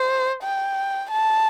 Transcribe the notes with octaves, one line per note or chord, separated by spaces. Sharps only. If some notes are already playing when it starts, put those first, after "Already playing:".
Already playing: C5
G5
A5